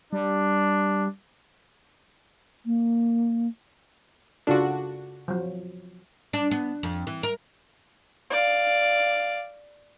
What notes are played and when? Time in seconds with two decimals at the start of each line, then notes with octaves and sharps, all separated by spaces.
0.13 G3 D4
2.66 A#3
4.47 C#3 D4 F4 F#4 A4
5.28 F3 F#3
6.33 D4
6.51 B3
6.83 F2
7.07 E3
7.23 A#4
8.31 D5 F5